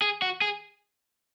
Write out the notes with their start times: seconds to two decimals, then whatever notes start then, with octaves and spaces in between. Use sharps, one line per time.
0.02 G#4
0.22 F#4
0.42 G#4